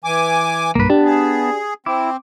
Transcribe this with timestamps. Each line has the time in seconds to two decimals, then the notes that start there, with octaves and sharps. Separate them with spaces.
0.04 E3 G#5 D6
0.75 B1 G2 A#3 B4
0.90 B3 D4 G4 A5
1.05 G#4
1.86 C4 E4 D6